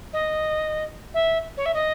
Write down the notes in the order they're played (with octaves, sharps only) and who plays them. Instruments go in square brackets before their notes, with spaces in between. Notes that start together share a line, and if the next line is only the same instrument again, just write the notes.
[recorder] D#5
E5
C#5
E5
D#5